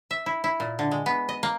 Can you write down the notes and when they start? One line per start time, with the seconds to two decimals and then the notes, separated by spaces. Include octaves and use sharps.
0.11 E5
0.26 E4
0.44 E4
0.60 A#2
0.79 D3
0.91 G#3
1.06 B3
1.29 D#5
1.43 A#3